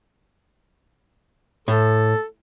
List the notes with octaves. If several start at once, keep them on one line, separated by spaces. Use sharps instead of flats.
A2 A4